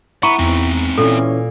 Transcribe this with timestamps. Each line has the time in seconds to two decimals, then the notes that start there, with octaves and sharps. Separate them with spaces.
0.23 E4 F#5 A#5 B5 C#6
0.39 E2 C4 D#4
0.98 A#2 E3 C#4 A4